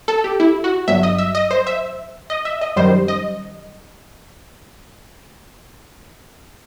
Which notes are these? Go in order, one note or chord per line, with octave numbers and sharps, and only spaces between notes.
A4
G4
E4
F#4
G1 G2 F#3 E5
D#5
E5
D#5
C5
E5
D#5
E5
D#5
F#2 D#3 G3 C5
D#5